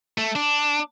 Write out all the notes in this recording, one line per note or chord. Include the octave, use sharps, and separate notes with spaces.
A3
D4